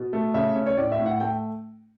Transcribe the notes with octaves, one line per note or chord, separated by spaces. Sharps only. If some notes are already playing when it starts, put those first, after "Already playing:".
Already playing: B2
A3
C#3 E5
C#4
C#5
A2 D5
E5
A2
F#5
A3 G5